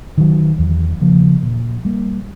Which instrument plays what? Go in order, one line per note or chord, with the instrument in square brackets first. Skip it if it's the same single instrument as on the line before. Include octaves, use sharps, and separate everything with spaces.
[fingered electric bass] D#3 F#3
E2
C#3 F3 A#3
A#2
G3 A#3